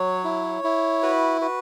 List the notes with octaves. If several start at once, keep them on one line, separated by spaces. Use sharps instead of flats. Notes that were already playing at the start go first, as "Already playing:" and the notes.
Already playing: F#3 C#5
E4
E4
F#4 B4
F#4 B4